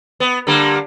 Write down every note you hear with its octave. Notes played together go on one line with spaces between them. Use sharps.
B3
D3 G3 A#3